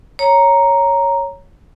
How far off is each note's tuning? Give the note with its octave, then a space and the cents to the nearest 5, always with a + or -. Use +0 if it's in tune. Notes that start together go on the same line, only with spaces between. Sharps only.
C#5 +0 A#5 +0